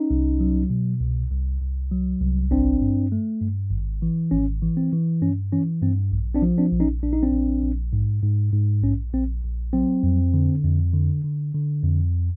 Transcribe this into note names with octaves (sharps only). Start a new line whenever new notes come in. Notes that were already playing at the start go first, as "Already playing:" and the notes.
Already playing: C#4 D#4
C2
F#3
B2
C2
C2
C2
F#3
C2
G#1 C4 D4
G2
A3
G2
G#1
E3
G#1 C#4
E3
C4
E3
G2 C#4
E3 C#4
G2 C4
A#1
C4 D4
F3
C4 D4
A#1
C#4 D#4
A#1 D4
D#4
C4 D4
A#1
A#1
G#2
G#2
G#2
A#1 C#4
A#1 C4
A#1
F#3 C4
F2
D3
F2
D3
D3
D3
F2